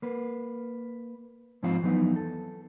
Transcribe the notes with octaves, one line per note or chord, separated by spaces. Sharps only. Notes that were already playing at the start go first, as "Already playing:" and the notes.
A#3 B4
G#2 F3 G#3 C4 F4 F5
F2 E3 F#3 B3 D#4
A4